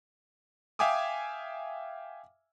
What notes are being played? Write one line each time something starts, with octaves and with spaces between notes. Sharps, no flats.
E5 F5 G5 G#5 D6 D#6